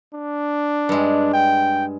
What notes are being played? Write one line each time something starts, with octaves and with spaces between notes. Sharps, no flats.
D4
G2 G#3
G5